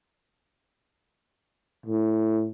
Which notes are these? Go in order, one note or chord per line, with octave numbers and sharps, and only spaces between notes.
A2